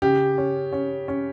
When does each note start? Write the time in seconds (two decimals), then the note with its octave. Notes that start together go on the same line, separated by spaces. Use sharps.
0.02 C#3 G4
0.38 C#4
0.72 C#4
1.08 C#4